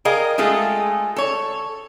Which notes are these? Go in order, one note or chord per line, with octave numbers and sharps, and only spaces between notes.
G#4 A#4 D#5 F5 G5
G#3 A3 F4 G#4 A4
A4 C#5